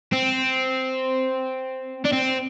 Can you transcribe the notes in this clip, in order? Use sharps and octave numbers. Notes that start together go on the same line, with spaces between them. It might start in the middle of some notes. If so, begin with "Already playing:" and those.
C4
D4
C4